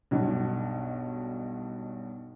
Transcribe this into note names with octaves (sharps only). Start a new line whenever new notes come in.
B1 G2 B2